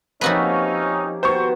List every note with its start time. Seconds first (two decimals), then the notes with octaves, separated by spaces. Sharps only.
0.21 C3 F3 A#3 C4 C#4 D#4 F#4 B4
1.23 B2 D#3 C5 C#6